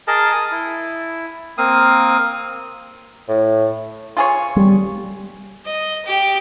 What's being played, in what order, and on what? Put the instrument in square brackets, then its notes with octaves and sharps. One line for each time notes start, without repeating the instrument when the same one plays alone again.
[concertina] G#4 A#4 D#5 A5
D#6
E4
A#3 C4 F5 D#6
[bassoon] A2
[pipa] F4 G#4 C#5
[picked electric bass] G3
[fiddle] D#5
G4